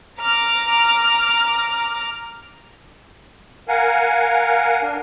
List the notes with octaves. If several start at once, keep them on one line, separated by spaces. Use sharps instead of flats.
A#5 D6 F6
A#4 F5 F#5 G#5
D4 A#4